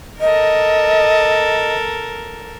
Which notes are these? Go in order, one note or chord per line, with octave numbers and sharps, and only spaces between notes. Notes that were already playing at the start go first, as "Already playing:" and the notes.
A4 A#4 D#5